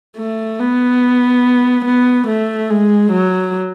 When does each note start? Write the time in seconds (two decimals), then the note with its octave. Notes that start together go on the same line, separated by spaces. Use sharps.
0.17 A3
0.59 B3
1.85 B3
2.27 A3
2.70 G#3
3.11 F#3